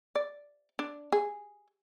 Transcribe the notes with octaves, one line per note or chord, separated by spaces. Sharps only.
D5
D4
G#4